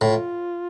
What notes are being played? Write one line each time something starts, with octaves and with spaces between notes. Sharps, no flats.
A2 F4